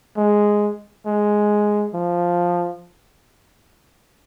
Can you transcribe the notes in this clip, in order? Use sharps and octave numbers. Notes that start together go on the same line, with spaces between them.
G#3
G#3
F3